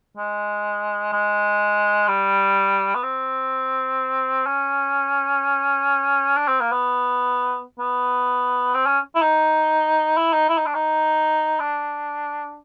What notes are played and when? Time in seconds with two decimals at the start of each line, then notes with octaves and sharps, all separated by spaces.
0.18 G#3
1.13 G#3
2.08 G3
2.95 B3
3.03 C4
4.46 C#4
6.37 D4
6.48 C4
6.60 A#3
6.72 B3
7.79 B3
8.74 C4
8.86 C#4
9.15 E4
9.22 D#4
10.17 E4
10.33 D#4
10.49 E4
10.58 D#4
10.66 D4
10.75 D#4
11.60 D4